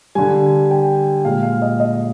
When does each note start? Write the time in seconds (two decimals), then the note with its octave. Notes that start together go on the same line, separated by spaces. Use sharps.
0.15 D3 G3 G#5
0.71 G5
1.25 A#2 G#3 F5
1.43 F5
1.62 D#5
1.80 D#5